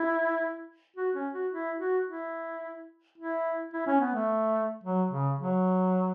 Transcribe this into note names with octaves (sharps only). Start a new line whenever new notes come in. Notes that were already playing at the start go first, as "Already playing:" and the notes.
Already playing: E4
F#4
C#4
F#4
E4
F#4
E4
E4
E4
C#4
B3
A3
F#3
C#3
F#3